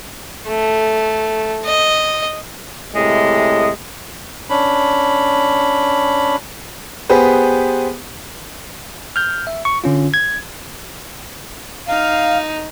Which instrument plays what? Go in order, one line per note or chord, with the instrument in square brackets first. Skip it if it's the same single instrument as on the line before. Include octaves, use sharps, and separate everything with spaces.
[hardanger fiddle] A3
D#5
[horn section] A2 C3 G#3
[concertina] C#4 D4 B5
[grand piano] B3 G4 G#4 B4 C5
[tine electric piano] F6 G6
E5
C#6
D3 C#4 F4
G#6
[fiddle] D#4 [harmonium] F5